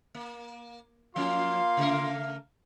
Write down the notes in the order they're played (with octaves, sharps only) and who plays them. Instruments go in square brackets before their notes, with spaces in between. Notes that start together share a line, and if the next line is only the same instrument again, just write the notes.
[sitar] A#3
[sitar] F3 C#4 [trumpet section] A#3 F4 C6 [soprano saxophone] F5
[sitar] C#3 A3 A#4